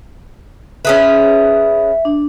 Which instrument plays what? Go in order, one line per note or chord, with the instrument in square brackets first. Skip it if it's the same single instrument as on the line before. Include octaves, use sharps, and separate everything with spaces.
[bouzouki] C#4 G#4 B4 [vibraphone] E5
[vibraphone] D4